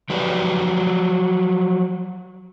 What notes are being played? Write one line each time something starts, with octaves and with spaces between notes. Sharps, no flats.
F3 F#3 G4 B4 C#5 D5